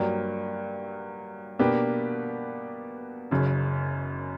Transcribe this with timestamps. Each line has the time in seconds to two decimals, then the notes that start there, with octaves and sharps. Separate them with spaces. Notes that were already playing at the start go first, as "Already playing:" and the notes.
Already playing: G2 F#3 A#3
1.59 B2 A#3 D4 G4 B4
3.31 F#1 F#2 C#3